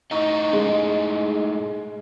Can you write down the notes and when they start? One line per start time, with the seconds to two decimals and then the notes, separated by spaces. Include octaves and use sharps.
0.11 A2 D#4 D#5 A#5 C#6
0.53 G#3